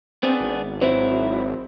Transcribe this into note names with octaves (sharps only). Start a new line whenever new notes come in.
B3 C4 D4 G#4
G#1
F#3 C4 E4